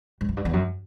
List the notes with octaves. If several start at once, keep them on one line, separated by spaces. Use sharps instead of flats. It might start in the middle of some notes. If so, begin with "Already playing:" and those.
G2
F#2
G2
E2
F#2